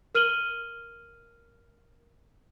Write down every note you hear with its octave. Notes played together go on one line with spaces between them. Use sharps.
A#4 F6 D#7 F#7 G7